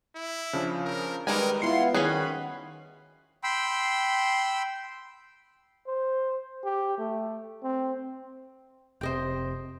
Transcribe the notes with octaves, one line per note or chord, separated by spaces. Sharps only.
E4
C#3 F3 D4
A#4
D#3 G3 G#3 G4 A#4 B4 G#5
B3 E4 F4 C6 C7 C#7
D#3 C#4 F#4 G#4 B5 F#6 C7
G5 B5 C6 E6
C5
G4
A3
C4
F1 C3 C5 D#5 G5